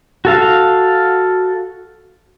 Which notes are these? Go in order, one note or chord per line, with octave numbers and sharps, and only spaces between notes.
F#4 A4 F5